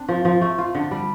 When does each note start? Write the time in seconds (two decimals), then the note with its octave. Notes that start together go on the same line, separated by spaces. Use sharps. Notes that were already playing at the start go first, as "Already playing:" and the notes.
Already playing: C4 D4
0.09 F3
0.25 F3
0.41 A3
0.58 F4
0.75 D3
0.91 G3